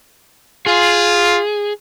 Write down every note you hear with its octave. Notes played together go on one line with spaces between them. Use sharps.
F4 G#4